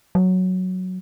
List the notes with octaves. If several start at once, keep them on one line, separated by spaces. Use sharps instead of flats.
F#3